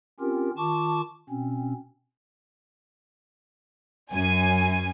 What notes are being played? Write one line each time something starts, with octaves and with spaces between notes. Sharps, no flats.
C4 C#4 F4 G4 A#4
D#3 F4 A5 C#6 D6
B2 C4 C#4
F#2 G#5